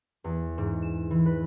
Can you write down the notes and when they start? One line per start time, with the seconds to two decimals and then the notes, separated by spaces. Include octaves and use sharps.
0.24 E2
0.58 G#2
0.82 E7
1.11 E3
1.26 B4